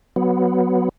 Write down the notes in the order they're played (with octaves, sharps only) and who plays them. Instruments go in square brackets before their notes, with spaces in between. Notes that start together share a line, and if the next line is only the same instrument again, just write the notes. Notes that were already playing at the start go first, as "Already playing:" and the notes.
[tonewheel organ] F#3 B3